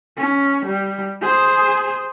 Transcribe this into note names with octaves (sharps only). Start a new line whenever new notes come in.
C#4
G3
G#4 C5